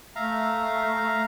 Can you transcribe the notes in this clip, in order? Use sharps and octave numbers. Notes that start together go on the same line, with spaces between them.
A3 E5 F5 A#5